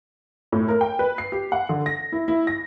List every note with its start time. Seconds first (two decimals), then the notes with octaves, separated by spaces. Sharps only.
0.52 A2
0.68 A#4
0.81 G5
0.99 B4
1.18 C7
1.32 G4
1.52 F#5
1.69 D3
1.86 A#6
2.12 E4
2.28 E4
2.47 A#6